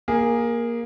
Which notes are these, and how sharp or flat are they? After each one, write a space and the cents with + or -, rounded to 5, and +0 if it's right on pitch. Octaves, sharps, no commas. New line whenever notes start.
A#3 +10 G#4 -10